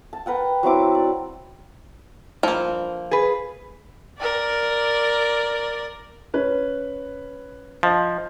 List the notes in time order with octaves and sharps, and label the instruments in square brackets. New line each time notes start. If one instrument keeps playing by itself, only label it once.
[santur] A5
A#4 B4 F#5 G5
F#3 C4 E4 D6
D5
[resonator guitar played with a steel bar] G2 [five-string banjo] F3 A#3
[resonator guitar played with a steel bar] G#4 B4
[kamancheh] A#4 D5
[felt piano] C#4 B4
[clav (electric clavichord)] F3 [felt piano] D#5